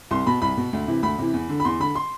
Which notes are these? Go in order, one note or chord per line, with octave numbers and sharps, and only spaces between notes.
C2 C6
B2 B5
C2 B5
B2
D2
C3 E3
D2 B5
C3 E3
E2
D3
B5
E2 C6
D3 B5
C6